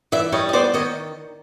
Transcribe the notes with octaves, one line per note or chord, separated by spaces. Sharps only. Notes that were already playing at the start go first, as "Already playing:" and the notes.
E3 D5 E5
G3 C#5 D#5
D#5
B3 C5 D5
D#3 C#5 D#5